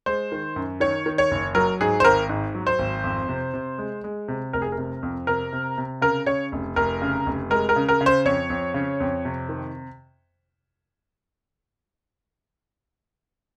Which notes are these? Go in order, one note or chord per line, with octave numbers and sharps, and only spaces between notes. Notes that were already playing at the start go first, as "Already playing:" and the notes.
G#3 C5
D#3
F#2
D#3 C#5
D#3
C#5
F#1
F#3 A#4
G#2 G#4
C5
G#1 A#4
G#2
F#3
C5
G#1
F2
C3
C3
G#3
G#3
C3
F1 A#4
G#4
A#4
C3
F2
C3 A#4
C3
C3
C#3 A#4
C#3 C#5
F1
F1 A#4
C#3
F1
G#3 A#4
A#4
C#3
A#4
C#3
C5
F2 C#5
F2
C#3
F2
C3
D#3